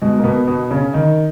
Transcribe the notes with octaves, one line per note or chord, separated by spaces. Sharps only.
B2 G#3
A#3
B2 B3
B2 B3
C#3 C#4
D#3 D#4